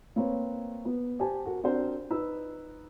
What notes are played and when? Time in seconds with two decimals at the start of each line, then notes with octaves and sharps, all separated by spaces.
0.16 A#3 C4 B4 C#5
0.85 B3 B4
1.19 G4 C5 G#5 A5
1.46 F#4 A#4
1.64 C4 D4 F#4 A#4 C5
2.10 D#4 B4 E6